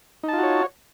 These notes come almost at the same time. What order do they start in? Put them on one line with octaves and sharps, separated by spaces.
D#4 A5 F4 F#4 C#5